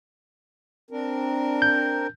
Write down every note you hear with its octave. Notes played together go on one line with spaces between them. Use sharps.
C4 D4 A#4
G6